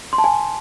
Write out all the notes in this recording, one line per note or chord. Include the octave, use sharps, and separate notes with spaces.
C6
A5
G#5